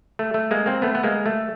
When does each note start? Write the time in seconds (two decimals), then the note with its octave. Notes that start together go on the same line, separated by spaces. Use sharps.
0.19 A3
0.34 A3
0.51 G#3 A#3
0.66 A#3 C4
0.82 A3 B3
0.95 B3
1.03 G#3 A#3
1.26 A3